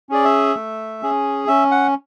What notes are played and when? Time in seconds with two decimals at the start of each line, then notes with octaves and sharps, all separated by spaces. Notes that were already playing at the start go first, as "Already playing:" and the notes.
0.09 C#4 G#4 D5
0.25 E5
0.55 A3
1.02 C#4 G#4
1.48 C#4 E5
1.71 F#5